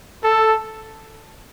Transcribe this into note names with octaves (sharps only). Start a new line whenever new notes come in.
A4